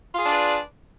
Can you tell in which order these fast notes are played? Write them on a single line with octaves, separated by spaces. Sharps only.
F4 G#4 D4 D5 B4